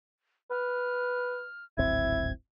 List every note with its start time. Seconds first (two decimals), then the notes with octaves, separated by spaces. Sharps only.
0.51 B4 F6
1.78 D1 G#1 C4 E4 G#6